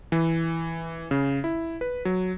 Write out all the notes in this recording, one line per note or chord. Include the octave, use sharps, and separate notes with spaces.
E3
C#3
E4
B4
F#3